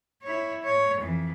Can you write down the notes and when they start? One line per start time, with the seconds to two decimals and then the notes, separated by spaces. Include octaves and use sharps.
0.23 E4 C#5
0.63 C#5
0.97 F2 E3